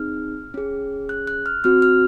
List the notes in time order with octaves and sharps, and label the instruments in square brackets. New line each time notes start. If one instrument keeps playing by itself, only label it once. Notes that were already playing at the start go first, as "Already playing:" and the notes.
Already playing: [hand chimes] C4 D#4 G#4 F6
C#4 G#4
F#6
F#6
F6
C4 F#4 F6
F6